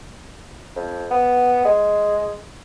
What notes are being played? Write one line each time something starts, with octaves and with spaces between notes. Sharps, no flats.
F2
B3
G#3